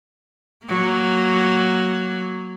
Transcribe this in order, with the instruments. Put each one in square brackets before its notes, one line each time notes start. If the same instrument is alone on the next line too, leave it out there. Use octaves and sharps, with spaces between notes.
[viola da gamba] F#3 A#3